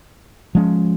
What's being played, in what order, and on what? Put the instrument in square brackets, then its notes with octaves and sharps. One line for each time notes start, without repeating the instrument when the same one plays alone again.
[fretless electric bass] F3 G#3 C#4